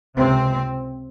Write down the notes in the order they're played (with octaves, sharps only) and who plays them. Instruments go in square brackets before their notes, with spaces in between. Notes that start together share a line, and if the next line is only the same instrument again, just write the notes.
[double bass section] C#2 C3 C4